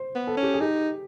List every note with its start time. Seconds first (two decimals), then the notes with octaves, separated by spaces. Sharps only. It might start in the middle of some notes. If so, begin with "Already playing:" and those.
Already playing: C5
0.15 B3
0.27 A4
0.37 C#4
0.43 G4
0.54 G#4
0.60 D#4 G4